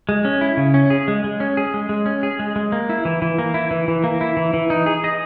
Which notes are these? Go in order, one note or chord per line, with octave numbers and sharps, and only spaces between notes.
G#3
C#4
E4
C#3
C#4
G#4
G#3
G#3
C#4
G#4
G#3
G#3
C#4
G#4
G#3
G#3
A#3
E4
E3
E3
A#3
E4
E3
E3
A#3
E4
E3
E3
D#4
G#4
D#5